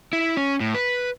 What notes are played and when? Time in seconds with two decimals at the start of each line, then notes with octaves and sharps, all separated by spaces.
0.13 E4
0.37 C#4
0.60 A2
0.75 B4